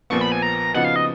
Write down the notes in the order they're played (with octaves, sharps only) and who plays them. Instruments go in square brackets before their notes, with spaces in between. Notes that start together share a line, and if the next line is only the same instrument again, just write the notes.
[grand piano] A#1 A#2 F3 B3 [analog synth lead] C#6
[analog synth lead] B5
G#5
A#5
[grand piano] C#3 F3 B3 D#4 F#4 [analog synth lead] F#5
[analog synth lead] F5
D#5